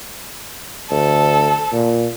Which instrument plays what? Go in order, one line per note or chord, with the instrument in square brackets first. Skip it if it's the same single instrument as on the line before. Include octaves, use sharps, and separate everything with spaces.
[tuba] D2 [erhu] A4
[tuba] A#2